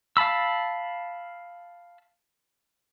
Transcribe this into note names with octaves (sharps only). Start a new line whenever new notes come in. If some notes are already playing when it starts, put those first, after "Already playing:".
F5 A5 B5 E6